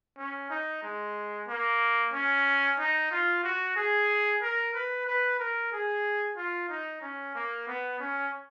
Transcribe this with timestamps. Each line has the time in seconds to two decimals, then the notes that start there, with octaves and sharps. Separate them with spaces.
0.18 C#4
0.50 D#4
0.82 G#3
1.48 A#3
2.13 C#4
2.79 D#4
3.11 F4
3.43 F#4
3.76 G#4
4.42 A#4
4.74 B4
5.06 B4
5.39 A#4
5.72 G#4
6.37 F4
6.69 D#4
7.02 C#4
7.35 A#3
7.67 B3
8.00 C#4